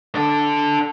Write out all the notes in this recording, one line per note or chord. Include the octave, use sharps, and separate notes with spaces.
D4 A4